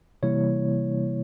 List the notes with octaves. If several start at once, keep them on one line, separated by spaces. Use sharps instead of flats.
C3 E3 G3 A#3 E4 C#5